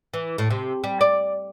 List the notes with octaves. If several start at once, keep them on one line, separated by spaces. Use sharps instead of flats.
E3
A2
C3
G3
D5